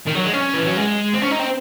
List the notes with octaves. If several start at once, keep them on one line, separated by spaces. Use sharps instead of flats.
D#3
F#3
G#3
C#4
E3
F#3
G#3
C4
C#4
D#4
C4